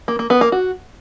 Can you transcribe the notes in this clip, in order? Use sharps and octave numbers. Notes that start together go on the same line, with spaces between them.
A#3
A#3
B3
A#3
F#4